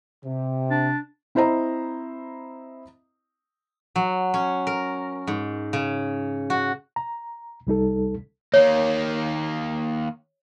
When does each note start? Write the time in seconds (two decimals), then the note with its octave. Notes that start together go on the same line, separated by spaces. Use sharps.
0.24 C3
0.71 D4
1.35 C4 E4 C5 D#5 A#5
3.96 F#3
4.34 C#4
4.67 A#4
5.27 G#2
5.73 C#3
6.50 F#4
6.96 A#5
7.67 C2 G3 D#4 A4
8.54 D#3 A#3 C#5